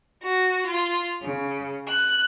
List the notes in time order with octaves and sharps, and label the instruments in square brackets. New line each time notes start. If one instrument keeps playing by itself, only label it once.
[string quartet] F#4
F4
C#3
F#6